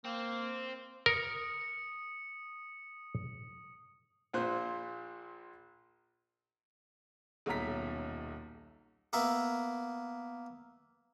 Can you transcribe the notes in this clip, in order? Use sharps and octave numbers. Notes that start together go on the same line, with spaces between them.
A#3 C4
A#4 D#6 C#7
A#1 A#2 C5 F#6
D#1 B1 C#5 A#5 B6
A#3 B3 A#4 E5